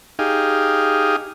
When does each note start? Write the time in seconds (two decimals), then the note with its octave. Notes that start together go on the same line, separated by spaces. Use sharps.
0.19 D#4 G4 G#4 F5